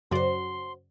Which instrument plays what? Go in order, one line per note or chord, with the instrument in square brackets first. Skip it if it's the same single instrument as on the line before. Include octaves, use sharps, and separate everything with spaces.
[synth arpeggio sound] F#2 C#3 D5 [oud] F#4 C5 [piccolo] C6